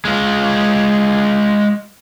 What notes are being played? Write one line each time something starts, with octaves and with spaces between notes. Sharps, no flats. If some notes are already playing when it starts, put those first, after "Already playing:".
G#3 F4